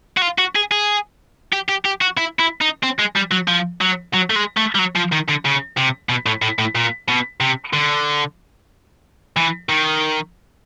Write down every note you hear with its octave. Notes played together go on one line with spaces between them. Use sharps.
F#4
F4
F#4
G#4
G#4
G4
G4
G4
F#4
E4
E4
D#4
C4
G#3
G3
F#3
F3
F#3
F#3
A3
G#3
A3
G3
F#3
F3
D#3
D3
C#3
C3
B2
A2
A2
A2
A#2
B2
C3
D3
E3
D#3